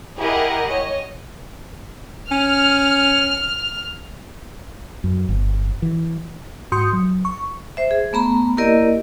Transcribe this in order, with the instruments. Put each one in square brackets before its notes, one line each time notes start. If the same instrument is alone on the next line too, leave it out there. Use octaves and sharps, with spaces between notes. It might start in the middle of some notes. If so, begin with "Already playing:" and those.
[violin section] E4 G4 G#4 A#4 D#5 F#5
C#5 D#5
[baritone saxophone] C#4 [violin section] F6
[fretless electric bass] F#2
G1
E3
[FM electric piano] G#2 F#4 C6 D#6 G6 C#7
F#3
C#6
[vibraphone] C5 E5
G#4
A3 B3 A#5 B5
A#3 E4 G4 A#4 D5 D#5